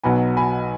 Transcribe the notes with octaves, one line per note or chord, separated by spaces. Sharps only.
B1 B2 F#3 B3 G#5 B5
G#5 B5